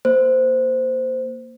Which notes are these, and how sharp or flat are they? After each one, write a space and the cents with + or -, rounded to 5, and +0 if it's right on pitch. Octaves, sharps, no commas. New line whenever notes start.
A#3 +0 C5 -15